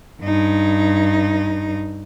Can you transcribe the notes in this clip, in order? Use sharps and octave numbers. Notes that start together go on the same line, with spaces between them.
G2 D#4